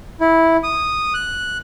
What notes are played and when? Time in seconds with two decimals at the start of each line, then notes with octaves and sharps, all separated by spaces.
0.20 E4
0.63 D#6
1.14 F#6